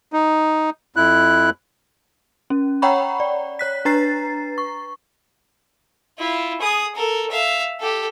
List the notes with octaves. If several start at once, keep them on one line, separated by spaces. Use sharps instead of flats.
D#4
F2 E4 F#6
C#4
C#5 F#5 G5 A#5 B5 C#6
D5
C#5 F#6 B6
D4 B4 A#5 A6 C7
C#6
E4 F4
G#4 D#6
A4 A#4
E5 F5
G4 A4